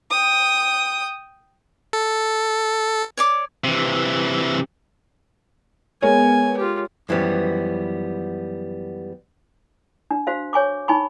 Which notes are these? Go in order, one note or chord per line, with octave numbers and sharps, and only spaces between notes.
G5 D#6
A4
C#5 D5 D6
C3 E3
G#3 B3 A#4 C#5 G#5
F4 G4
F#2 E3 F3 G3 B3
D4
F#4 C5 F5
C#5 G#5 C#6 D6
D#4 G#5 B5 C#6